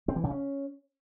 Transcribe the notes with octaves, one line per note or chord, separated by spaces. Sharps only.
C4
E3
C#3
C#4